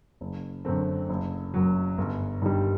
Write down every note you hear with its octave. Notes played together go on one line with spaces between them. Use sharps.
F#1
F#2 D3 A3 C4
F#1
F#2 F#3
G1
G2 D#3 G3